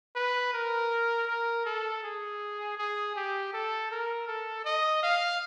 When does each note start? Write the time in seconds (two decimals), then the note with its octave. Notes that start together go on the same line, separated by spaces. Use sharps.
0.16 B4
0.54 A#4
1.28 A#4
1.66 A4
2.04 G#4
2.78 G#4
3.16 G4
3.53 A4
3.91 A#4
4.28 A4
4.65 D#5
5.03 F5